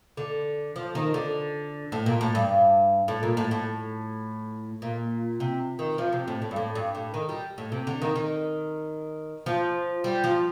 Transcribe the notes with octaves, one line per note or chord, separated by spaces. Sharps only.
D3
F3
D#3
D3
A2
A#2
A2
G2
A2
A#2
A2
A2
A#2
C3
D#3
F3
C3
A2
A2
G2
A2
G2
A2
D#3
G3
A2
C3
D3
D#3
D#3
F3
G3
F3